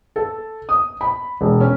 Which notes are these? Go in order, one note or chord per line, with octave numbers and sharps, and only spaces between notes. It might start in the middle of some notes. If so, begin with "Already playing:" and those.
A4
D#6
B5
E1
C#4